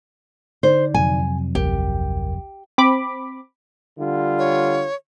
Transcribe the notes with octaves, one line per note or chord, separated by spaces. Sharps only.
D3 D#4 C5 D5
F2 C3 F#3 G#5
A1 D2 G4 A#4
C4 B5 D6
D3 G3 F4
C#5